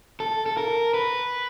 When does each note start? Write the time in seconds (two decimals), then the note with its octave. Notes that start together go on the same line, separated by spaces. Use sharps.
0.20 A4
0.46 A4
0.57 A#4
0.94 B4